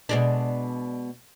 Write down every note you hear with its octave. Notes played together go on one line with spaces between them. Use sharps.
B2 G#3 D4